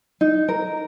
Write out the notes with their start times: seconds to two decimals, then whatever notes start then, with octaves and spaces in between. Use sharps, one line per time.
0.21 D#4
0.49 A#4